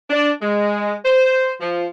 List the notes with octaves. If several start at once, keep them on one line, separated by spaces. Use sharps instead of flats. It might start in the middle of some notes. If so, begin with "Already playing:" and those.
D4
G#3
C5
F3